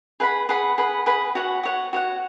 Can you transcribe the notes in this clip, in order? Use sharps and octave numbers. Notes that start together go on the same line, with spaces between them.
G#4 B4 F#5 B5
G#4 B4 F#5 B5
G#4 B4 F#5 B5
G#4 B4 F#5 B5
F#4 C#5 F#5
F#4 C#5 F#5
F#4 C#5 F#5